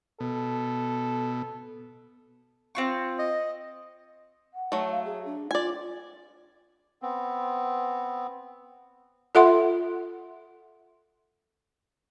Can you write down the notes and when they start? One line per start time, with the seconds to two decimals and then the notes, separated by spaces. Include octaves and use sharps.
0.20 B2 A4
2.75 C4 F4 C#6
3.19 D#5
4.54 F#5
4.72 F#3 A3
4.91 F5
5.05 G#4
5.25 D4
5.51 F4 D5 G#5
7.02 B3 C4
9.35 F4 A4 E5 F#5 C6